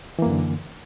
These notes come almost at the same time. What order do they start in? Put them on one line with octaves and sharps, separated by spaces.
E3 A#3 F#2 D3